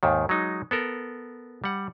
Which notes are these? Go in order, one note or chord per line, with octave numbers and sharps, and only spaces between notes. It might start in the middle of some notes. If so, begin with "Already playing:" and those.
D#2 G#2 D#3
F#3 G#3 D#4
B3 A4 A#4
G3 F#5